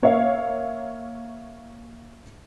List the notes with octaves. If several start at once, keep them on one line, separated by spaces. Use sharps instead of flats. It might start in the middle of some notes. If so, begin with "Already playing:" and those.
A#3 C#5 E5 F5